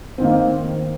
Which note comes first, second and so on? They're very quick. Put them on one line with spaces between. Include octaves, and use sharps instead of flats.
C4 D#3 A#3